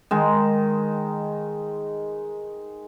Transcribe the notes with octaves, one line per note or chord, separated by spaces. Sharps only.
D#3 G#3